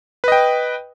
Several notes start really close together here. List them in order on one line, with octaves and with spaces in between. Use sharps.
B4 D#5 G5